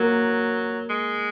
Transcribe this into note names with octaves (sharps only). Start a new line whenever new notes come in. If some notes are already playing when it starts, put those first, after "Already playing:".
Already playing: F#3 A#3
G#3